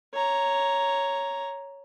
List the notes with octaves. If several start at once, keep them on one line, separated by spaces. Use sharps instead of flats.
C#5 A#5